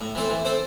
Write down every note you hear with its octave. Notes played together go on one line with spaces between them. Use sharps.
A2
E3 C4 A4 C5
E3
C4 A4 C5